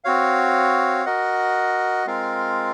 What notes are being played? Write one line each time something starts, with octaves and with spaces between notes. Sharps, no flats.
C4 F#4 C#5 F5
F#4 A#4 D#5 F#5
G#3 C4 F4 A#4 F5